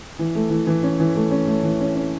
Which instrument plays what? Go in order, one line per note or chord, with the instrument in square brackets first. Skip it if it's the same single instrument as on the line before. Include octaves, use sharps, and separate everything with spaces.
[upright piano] E3
A3
E3
E3
C#4
E3
A3
C#4
A3
E3
C#4
C#4